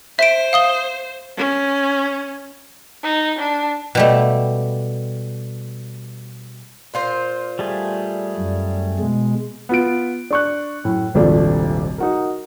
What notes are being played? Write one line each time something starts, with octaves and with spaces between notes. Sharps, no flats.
C5 E5 D7
F5 D#6 G7
C#4
D#4
D4
B2 G3 A3
A#2 F4 C5
G3 A3 G#4
F#2
B2 G#3
B3 F4 D7
D4 C#6 F#6
F#2 A2
D#1 G#1 C3 F3 A3 D4
D#4 F#4 A#4